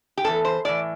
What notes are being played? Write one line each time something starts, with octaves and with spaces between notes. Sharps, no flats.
G4
E2 E3 A4
C5
A2 E3 D5